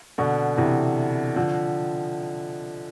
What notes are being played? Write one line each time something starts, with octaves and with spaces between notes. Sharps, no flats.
B2 D3
C3 E3
D3 F3